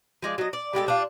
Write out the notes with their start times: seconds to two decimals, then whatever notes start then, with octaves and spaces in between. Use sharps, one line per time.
0.22 F3 G#3 D5
0.38 F#3 D#5
0.53 D5
0.73 G3 G#3 G4 A4
0.87 G3 D4 F4